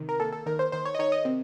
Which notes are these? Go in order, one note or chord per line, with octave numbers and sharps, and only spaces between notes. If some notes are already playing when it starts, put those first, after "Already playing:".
Already playing: C3 D#3
A#4
A#3 A4
A4
D#3 A#4
C5
D#3 C5
C#5
D#5
D#3 C#5
D#5
C3